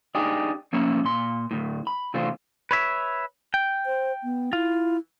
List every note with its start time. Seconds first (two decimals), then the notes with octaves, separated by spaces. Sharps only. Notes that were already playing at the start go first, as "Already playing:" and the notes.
0.15 D4 D#4 G4 G#4
0.73 F3 A#3 C#4 E4 C#5
1.05 A#2 C6
1.51 D2 A2
1.87 B5
2.14 C3 E3 A3 D4 F4 C5
2.71 B4 C#5 E5
3.54 G5
3.86 C5
4.24 B3
4.53 E4 F4